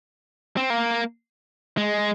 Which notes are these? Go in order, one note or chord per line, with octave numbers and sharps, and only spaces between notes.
C4
A#3
G#3